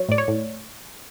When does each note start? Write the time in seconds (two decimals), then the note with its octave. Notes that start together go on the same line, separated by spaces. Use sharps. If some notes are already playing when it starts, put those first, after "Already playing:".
Already playing: F#3 C#5
0.09 A2 D5
0.18 C#5
0.28 A2